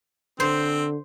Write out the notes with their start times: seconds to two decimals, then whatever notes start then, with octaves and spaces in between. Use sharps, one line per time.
0.40 D3 C4 C5